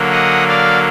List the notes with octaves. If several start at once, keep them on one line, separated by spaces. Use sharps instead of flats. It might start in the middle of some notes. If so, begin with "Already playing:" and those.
Already playing: D3 F#3 A#3
D#5 F#5
D5 F5